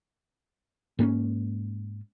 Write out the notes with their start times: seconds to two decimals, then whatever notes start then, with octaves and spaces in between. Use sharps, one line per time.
0.99 G#2 A#3 C4 C#4